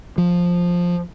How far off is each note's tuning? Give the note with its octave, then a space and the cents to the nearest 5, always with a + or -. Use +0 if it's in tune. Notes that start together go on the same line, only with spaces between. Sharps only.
F3 +10